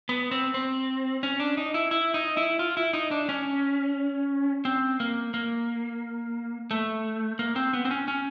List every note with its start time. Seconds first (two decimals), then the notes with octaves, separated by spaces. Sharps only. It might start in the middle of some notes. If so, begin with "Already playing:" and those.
0.09 B3
0.31 C4
0.54 C4
1.23 C#4
1.40 D4
1.57 D#4
1.74 E4
1.91 E4
2.14 D#4
2.37 E4
2.59 F4
2.77 E4
2.93 D#4
3.11 D4
3.29 C#4
4.65 C4
5.00 A#3
5.34 A#3
6.71 A3
7.39 A#3
7.56 C4
7.73 B3
7.85 C4
7.91 C#4
8.08 C#4